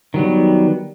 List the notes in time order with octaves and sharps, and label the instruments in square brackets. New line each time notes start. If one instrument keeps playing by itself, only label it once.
[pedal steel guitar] D#3 F#3 B3 [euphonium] G3